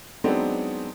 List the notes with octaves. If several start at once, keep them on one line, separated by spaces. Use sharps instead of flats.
F#3 G#3 B3 C4 D4 D#4